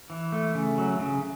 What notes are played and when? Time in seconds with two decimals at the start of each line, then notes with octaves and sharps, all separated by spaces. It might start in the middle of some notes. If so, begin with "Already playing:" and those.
0.10 E3
0.32 A3
0.55 C#3
0.78 F#3
0.99 C#3